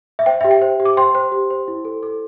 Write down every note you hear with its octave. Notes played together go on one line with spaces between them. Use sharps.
E5
C5 G5
G4 E5
G5
C5
G4
D6
C5 G5 C6
C5
G4
C5
E4
A4
A4